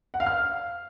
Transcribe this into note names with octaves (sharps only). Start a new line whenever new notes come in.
F#5
F5
F6